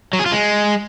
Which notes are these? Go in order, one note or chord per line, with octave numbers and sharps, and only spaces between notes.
F#3
G#4
F4
G#3